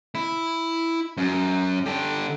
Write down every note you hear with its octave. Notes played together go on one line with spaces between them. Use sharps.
E4
F#2
D3 G4